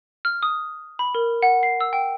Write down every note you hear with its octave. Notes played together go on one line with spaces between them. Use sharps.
F6
D#6
B5
A#4
F#5
C7
E6
G5